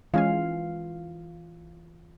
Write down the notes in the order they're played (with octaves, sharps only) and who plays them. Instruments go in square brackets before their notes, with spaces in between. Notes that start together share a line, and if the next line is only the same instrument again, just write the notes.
[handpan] E3 F4 F5 [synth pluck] G#3 C#4 G#5